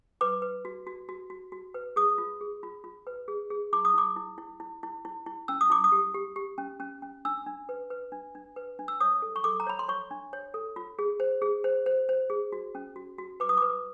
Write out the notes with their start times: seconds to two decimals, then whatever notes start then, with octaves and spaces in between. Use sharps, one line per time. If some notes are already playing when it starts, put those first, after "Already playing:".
0.21 B4 D6
0.42 B4
0.65 F#4
0.87 F#4
1.09 F#4
1.30 F#4
1.52 F#4
1.74 B4
1.96 G#4 D#6
2.18 F4
2.41 G#4
2.63 F4
2.84 F4
3.07 B4
3.28 G#4
3.50 G#4
3.73 E4 D6
3.85 D#6
3.94 E4 D6
4.16 E4
4.38 E4
4.60 E4
4.83 E4
5.05 E4
5.26 E4
5.48 C#4 E6
5.61 D#6
5.70 E4 D6
5.84 D#6
5.92 G4
6.14 G4
6.36 G4
6.58 C#4
6.80 C#4
7.02 C#4
7.25 D4 E6
7.46 D4
7.69 B4
7.90 B4
8.12 D4
8.35 D4
8.56 B4
8.79 D4
8.88 E6
9.00 C#5 D#6
9.22 A4
9.36 C#6
9.44 A4 D6
9.60 A#5
9.67 C#5 B5
9.79 C6
9.88 C#5 C#6
10.11 D4
10.33 C#5
10.54 A4
10.76 F4
10.99 G#4
11.20 C5
11.42 G#4
11.64 C5
11.86 C5
12.09 C5
12.30 G#4
12.52 F#4
12.75 C#4
12.96 F#4
13.18 F#4
13.40 B4 D6
13.49 D#6
13.57 B4 D6